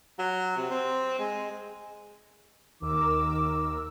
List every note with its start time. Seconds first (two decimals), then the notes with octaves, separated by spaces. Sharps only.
0.19 F#3
0.57 C3
0.71 C4
1.19 G#3
2.82 D#2 D#3 A#4 D6 E6